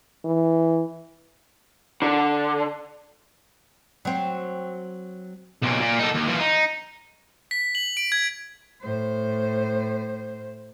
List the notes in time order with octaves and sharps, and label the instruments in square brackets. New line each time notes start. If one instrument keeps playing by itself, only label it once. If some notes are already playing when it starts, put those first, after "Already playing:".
[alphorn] E3
[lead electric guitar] D3
[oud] F#3 C4
[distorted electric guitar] B1 A#2
A#2
D#4 A4
D#2
E3 F3
D#4
[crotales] B6
F#7
D7
G#6
[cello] A2 C5